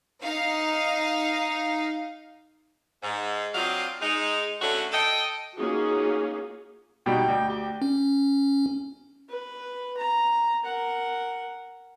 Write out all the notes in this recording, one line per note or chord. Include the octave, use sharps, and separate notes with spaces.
D#4 F5
G#2
F#3 C4 D4 F4 D#5 F5
G#3 D#4
A2 D3 A3 C#4 D4 F#4
A4 D#5 G5
A#3 C#4 D#4 F4 F#4 G#4
B2 G3 D#4 G5
D2
G4
C#4
B4
A#5
A#4 F#5